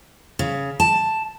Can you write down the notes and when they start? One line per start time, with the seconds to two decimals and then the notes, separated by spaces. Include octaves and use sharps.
0.39 C#3
0.80 A5